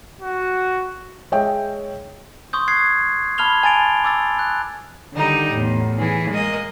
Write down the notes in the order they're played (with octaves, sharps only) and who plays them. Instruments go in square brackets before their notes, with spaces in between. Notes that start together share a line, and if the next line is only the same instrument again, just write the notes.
[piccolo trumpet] F#4
[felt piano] G#3 C#5 D#5 E5 G5
[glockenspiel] C6 C#6 D#6 G6
D#6 F#6 G#6 C7
A5 B5 F6 G#6 F7 G7
G#5 A5 A6 D7 F7
D6 E6 A6
F#6
[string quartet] D3 D#3 G3 D#4
E2 A2
E3 G#4
G#3 A#3 D#5